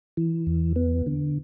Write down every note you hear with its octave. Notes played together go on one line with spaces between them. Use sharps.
E3
E2
B3
D3